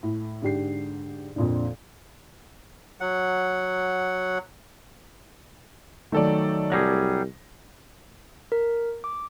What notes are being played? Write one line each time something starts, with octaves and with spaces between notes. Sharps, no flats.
A2
G#2 D3 G4 C7
F2 A#2 D3
F#3 F#5
D#3 F#3 A3 A4 D5
C2 F#3 G3 G#4 A#6
A#4
D6